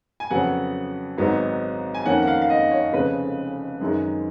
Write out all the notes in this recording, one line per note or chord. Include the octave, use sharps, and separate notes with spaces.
G#5
F2 C#3 F#3 B3 F#5
G#1 G#2 F#3 B3 D#4
G#5
F2 D#3 A#3 C#4 F#5
F#5
F5
F5
D#5
C#5
F1 F2 C#3 G#3 C#4 B4
F#2 D#3 G#3